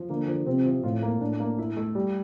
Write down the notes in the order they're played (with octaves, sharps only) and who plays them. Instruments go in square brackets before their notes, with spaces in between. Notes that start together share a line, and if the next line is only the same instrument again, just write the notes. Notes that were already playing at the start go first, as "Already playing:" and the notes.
Already playing: [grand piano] F3
[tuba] D3 [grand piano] A#3
[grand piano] F3
[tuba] C3 [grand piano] C4
[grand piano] F3
[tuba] A2 [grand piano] F4
[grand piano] A#3
[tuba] A2 [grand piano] D4
[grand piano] A#3
E4
A3
G3